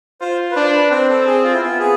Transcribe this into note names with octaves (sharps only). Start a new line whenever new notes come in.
F4 C5
B4
D4 C5
B4
C4 C5
A4
G#4
F4
E4
B3 F4
G#4